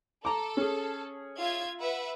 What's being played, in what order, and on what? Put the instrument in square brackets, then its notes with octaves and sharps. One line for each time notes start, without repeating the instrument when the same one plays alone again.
[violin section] A4 [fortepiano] A5 A#5 D6
[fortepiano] C#4 G#4
[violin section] F4 E5 G#6
B4 E5 F#5